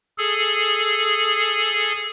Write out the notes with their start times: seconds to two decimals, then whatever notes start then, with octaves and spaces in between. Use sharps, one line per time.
0.18 G#4 A4